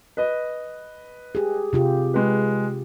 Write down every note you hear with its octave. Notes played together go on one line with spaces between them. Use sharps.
B4 D#5
G4 G#4
C3 F4 G4
G#3 B4